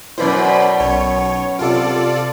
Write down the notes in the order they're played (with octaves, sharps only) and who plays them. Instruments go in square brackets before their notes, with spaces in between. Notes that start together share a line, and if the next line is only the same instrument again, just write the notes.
[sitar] F#2 B2 [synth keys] E4 B4 D5 [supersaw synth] C5 B5
[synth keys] B1 [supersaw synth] C#5
[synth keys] C3 D7 [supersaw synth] F4 A4 D5